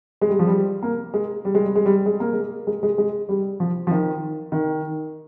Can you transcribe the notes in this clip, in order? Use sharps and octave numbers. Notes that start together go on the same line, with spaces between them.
G#3
G3
F3
G3
A#3
G#3
G3
G#3
G3
G#3
G3
G#3
A#3
G#3
G#3
G#3
G#3
G3
F3
F3
D#3
D#3